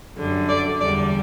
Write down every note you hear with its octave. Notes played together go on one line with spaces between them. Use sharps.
F#2 D3 G3
D5
E2 D3 G3 D5